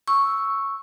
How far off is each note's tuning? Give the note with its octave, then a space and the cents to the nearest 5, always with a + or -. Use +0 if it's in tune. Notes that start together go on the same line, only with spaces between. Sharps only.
C#6 +0 E6 +0